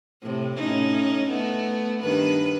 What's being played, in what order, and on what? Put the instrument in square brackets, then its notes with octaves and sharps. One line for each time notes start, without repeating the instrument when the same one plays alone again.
[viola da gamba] A2 C3
A2 C#4 D#4
A3 B3
G2 D#3 B4